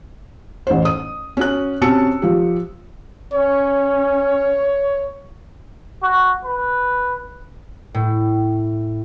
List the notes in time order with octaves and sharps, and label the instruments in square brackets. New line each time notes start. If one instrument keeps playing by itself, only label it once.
[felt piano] A1 C5
D#6
C#4 F#4 F#6
C3 C#4 F#4 A5 E6 C#7
F3 G4
[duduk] C#4 [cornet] C#5
[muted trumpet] F#4
B4
[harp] A2